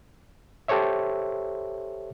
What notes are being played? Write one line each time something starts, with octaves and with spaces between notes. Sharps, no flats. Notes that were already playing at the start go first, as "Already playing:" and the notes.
G4 A4 C5 C#5 E5